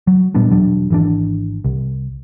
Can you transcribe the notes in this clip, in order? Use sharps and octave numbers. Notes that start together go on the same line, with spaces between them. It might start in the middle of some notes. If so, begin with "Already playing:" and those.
F#3
A#2 G3 B3 D4
E1 F#3 D4
G#1 E3 D4
C2